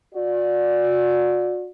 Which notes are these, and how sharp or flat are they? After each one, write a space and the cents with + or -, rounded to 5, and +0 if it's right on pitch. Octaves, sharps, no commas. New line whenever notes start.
F#4 -40 D5 +0